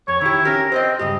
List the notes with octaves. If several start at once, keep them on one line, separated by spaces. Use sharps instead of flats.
F2 C#5
D#3 E4 G4
C#4 G4 A#4
C4 C5 D5 D#5
C#2 G2 G4 D#5